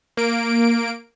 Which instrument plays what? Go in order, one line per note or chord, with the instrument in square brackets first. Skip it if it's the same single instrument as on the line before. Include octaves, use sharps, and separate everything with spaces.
[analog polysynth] A#3 D7